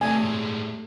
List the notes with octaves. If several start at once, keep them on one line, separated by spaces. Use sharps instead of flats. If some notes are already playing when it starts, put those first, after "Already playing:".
C3 G3 A3 D4 D#5 G#5
A2 G#3